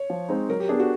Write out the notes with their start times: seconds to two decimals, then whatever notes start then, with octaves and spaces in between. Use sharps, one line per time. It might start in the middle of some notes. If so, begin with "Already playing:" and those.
Already playing: C#5
0.10 F3
0.29 G#3 C4 D#4
0.49 F#3 A#4
0.60 G4
0.69 B3 D4 G#4
0.80 F#4